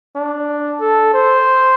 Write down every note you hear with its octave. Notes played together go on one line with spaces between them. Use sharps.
D4
A4
C5